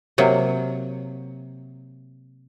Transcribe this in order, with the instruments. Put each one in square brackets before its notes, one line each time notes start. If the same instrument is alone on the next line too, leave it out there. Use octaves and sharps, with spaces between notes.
[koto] C3 F#3 A#3